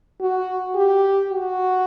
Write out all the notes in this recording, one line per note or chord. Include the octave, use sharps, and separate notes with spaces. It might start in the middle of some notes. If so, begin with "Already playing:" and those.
F#4
G4
F#4